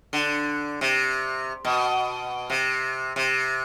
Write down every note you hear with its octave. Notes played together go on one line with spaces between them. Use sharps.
D3
C3
B2
C3
C3